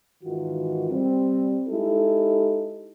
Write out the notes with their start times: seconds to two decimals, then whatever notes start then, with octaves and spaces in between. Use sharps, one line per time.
0.24 G#2 D#3 E3 F4 F#4
0.90 G3 C4
1.69 G#3 D#4 E4 G4 A4